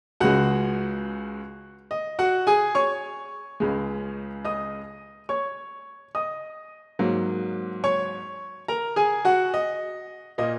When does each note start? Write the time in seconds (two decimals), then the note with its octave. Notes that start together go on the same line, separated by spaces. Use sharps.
0.20 C#2 C#3 G#3 F#4 F#5
1.91 D#5
2.19 F#4 F#5
2.47 G#4 G#5
2.75 C#5 C#6
3.60 C#2 C#3 G#3
4.45 D#5 D#6
5.29 C#5 C#6
6.15 D#5 D#6
6.99 G#2 F#3 A#3
7.84 C#5 C#6
8.68 A#4 A#5
8.96 G#4 G#5
9.25 F#4 F#5
9.54 D#5
10.38 A#2 A#3 D#5